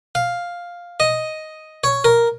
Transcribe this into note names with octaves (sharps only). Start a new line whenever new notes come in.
F5
D#5
C#5
A#4